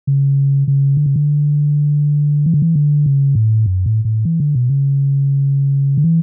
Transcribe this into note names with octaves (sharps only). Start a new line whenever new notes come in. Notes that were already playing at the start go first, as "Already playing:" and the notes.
C#3
C#3
D3
C#3
D3
E3
D3
E3
D3
C#3
A2
F#2
A2
A2
E3
D3
B2
C#3
D3
E3